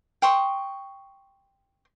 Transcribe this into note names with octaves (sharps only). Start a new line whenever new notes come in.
G5 C6 C#6 D#6